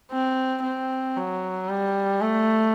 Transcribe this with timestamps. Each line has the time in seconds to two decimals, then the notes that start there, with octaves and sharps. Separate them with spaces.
0.11 C4
0.63 C4
1.17 F#3
1.69 G3
2.21 A3